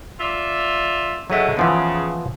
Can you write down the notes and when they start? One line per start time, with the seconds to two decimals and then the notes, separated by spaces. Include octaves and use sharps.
0.20 F4 D5 E5
1.30 D3 F#3 G#3 A3 E5
1.57 C#3 E3 F3 B3